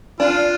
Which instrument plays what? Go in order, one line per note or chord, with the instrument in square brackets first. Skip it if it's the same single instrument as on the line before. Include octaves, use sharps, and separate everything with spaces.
[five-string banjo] D4 [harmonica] F4